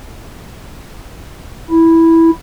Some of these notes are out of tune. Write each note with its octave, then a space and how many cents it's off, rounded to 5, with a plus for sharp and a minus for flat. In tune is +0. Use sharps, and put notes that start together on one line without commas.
E4 -5